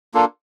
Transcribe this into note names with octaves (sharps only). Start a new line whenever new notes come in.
A#3 D4 F4 A4